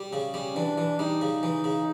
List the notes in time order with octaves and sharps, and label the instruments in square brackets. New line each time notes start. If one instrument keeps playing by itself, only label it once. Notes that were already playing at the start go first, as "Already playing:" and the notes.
Already playing: [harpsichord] G3
[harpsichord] C#3 [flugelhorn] C#4
[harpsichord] G3
[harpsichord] E3 [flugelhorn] D4
[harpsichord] E3
[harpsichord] G3 [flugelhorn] D#4
[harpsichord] C#3
E3
C#3